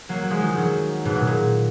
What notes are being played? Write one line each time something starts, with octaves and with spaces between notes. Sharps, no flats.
F#3 A#3
F#3
F3 G#3
D#3 F#3
D#3 F#3
G#2 B2
A#2
A#2